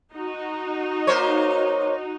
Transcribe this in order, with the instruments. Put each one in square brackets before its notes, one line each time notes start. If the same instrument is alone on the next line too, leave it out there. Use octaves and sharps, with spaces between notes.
[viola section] D#4 F#4
[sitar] A#3 C5 C#5